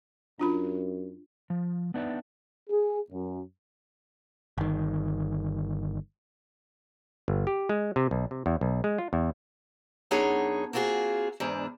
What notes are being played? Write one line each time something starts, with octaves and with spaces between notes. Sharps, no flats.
F#2 D4 F4 B5
F3
B3 D4 D#4 B4 D5 E5
G#4
F#2
G1 D#3
G1
G4
G#3
C3
B1
C3
E2
B1
G#3
F4
E2
F#2 B3 D4 D#4 G#4 C#5
A#3 C4 F4 F#4 G#4
E2 G#2 D4